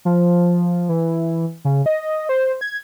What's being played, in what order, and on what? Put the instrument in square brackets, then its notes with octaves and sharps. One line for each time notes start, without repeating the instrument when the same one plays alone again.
[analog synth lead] F3
E3
C#3
D#5
C5
G#6